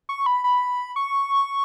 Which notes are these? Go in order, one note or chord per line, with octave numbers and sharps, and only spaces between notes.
C#6
B5
B5
C#6